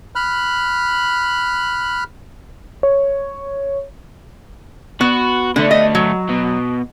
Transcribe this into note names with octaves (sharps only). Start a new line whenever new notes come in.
B5 F6 F#6
C#5
B3 F#4
D2 D3 A3
D#5
F#3
B2